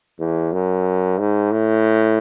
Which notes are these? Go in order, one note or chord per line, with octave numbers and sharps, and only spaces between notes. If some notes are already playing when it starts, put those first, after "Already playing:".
E2
F#2
G#2
A2